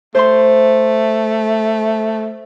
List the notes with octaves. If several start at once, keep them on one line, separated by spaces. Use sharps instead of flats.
A3 C5 C6